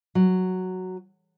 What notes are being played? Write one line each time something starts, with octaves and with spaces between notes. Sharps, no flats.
F#3